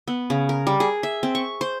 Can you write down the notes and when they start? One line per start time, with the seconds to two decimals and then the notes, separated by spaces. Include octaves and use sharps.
0.08 B3
0.30 C#3
0.49 A#4
0.67 G3
0.80 G#4
1.03 E5
1.23 C4
1.35 C#6
1.61 C5